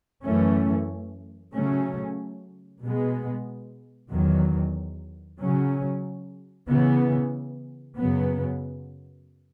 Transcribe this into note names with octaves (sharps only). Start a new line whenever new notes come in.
F#2 E3 A3 C#4
C#3 F#3 A3 C#4
B2 G#3 B3
E2 D#3 F#3
C#3 F#3 C#4
C#3 E3 B3
F#2 C#3 F#3 B3